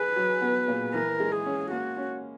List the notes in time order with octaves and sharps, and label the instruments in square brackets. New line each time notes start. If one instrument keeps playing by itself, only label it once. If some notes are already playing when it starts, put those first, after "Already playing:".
Already playing: [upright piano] G#4 [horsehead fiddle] B4
[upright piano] F#3
B3
A#2
[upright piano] E3 [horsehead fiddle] A#4
[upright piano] G#3
[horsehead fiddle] G#4
[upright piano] C#4
[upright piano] A#3 [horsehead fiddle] F#4
[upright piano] C#4